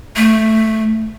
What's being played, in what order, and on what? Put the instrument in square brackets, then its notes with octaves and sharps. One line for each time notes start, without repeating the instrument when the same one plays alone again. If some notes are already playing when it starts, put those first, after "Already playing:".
[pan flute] A3